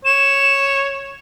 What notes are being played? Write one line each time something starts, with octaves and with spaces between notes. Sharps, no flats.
C#5 E7